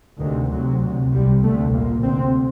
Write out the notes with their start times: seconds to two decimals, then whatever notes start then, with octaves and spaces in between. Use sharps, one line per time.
0.19 D2 C3 D#3
0.51 D2 C3 F#3
0.80 D2 C3
1.11 C2 C3 G3
1.42 D2 C3 A3
1.73 A#1 A#2 A#3
2.03 D2 C3 C4